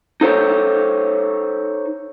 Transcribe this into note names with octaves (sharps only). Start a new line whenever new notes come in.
D#4 A4 C5 C#5